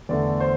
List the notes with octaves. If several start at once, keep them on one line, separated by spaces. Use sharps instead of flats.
E2 D3 A3 D5
C5